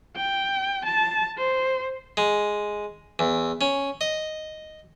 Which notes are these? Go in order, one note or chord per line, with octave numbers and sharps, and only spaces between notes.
G5
A5
C5
G#3
E2
C#4
D#5